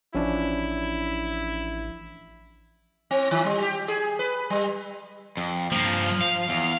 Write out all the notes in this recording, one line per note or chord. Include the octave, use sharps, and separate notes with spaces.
A1 F3 C#4 D4 E4
C4
D#3
G3
G4
G#4
B4
G3
F2
G2 F3 A#3
F5
E2